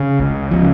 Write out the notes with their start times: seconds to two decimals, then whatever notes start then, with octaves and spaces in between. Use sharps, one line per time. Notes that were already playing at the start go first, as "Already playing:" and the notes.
Already playing: C#3
0.20 C#2
0.51 C#3 F3